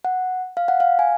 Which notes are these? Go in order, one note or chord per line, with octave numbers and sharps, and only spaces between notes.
F#5
F5
F#5
F5
G#5